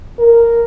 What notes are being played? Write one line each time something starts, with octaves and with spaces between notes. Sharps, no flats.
A#4